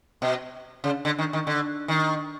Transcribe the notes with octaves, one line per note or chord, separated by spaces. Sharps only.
B2
C#3
D3
D#3
D#3
D3
D#3